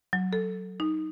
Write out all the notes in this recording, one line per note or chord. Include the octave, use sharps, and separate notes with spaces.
F#3
A4
D#4